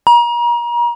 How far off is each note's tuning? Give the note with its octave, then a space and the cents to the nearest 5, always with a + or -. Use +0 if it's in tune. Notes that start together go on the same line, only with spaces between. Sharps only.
A#5 +35